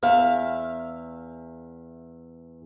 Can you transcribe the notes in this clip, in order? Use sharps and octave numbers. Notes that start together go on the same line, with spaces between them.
E2 E5 F5